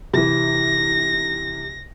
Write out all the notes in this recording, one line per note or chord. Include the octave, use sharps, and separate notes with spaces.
C3 E3 A#6